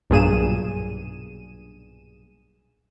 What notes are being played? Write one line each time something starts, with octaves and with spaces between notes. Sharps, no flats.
B1 G2 A#2 G#4 D#7 E7